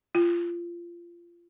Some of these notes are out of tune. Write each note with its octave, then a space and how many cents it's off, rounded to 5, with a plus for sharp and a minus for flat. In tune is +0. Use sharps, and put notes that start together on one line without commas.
F4 -20